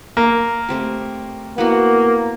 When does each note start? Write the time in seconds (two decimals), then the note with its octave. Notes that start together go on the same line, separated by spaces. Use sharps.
0.17 A#3
0.69 A3 C4 G4
1.58 A#3 B3 E4 F#4